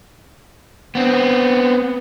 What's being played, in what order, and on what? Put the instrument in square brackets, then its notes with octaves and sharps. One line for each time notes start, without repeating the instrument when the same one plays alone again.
[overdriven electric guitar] B3 C4